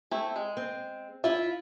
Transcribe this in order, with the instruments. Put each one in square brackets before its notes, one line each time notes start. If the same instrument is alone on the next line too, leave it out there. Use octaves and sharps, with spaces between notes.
[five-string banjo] A3 C4 E4
G#3
[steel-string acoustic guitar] C4
[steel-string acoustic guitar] E4 F4 [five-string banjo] E5